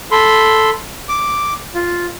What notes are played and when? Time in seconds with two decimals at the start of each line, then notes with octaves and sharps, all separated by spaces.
0.12 A4 B5 C6
1.09 D6
1.75 F4